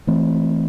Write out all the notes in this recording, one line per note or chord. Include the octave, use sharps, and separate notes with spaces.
E3 A3 C4